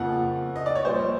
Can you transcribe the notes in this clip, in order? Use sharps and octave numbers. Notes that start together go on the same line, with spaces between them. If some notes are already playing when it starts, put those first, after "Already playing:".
Already playing: F2 C#3 F3 A#3 F#5
D#5
D5
C#5
A#1 A#2 G3 C5